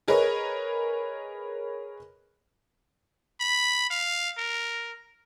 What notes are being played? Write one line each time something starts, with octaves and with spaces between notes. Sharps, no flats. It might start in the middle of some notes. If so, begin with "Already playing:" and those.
G#4 A#4 B4 C#5 D#5
B5
F5
A#4